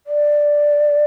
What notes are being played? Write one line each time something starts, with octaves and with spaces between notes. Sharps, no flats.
D5